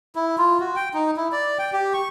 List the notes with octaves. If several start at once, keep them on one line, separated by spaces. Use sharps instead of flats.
E4
F4
F#4
G5
D#4
E4
D5
G5
G4
C#6